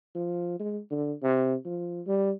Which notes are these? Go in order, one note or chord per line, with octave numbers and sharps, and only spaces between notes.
F3
G#3
D3
C3
F3
G3